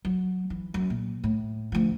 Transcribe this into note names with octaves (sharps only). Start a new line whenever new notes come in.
F#3
E3
F#2
A#2
A2
D2 F3